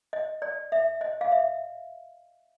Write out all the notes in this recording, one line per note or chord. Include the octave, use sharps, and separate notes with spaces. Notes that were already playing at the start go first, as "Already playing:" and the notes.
D#5
D5
E5
D#5
F5
E5